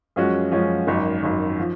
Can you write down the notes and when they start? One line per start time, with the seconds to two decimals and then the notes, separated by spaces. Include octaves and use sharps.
0.16 F#2 F3 G#3 C#4 F#4
0.52 F#2 F3 G#3 C#4 F#4
0.87 G#1 F#2 D#3
1.23 G#1 F#2 D#3
1.59 F3